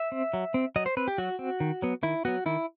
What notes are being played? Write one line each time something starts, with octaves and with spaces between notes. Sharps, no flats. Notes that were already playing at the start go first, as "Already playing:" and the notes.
Already playing: E5
C4
F#3
C4
F#3 D#5
C5
C4 B4
G4
F#3 F#4
C4
D#3
F#3 B3
D#3 E4
F#3 B3 F#4
D#3 E4